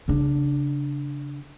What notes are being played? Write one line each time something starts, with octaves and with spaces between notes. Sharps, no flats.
C#3 D4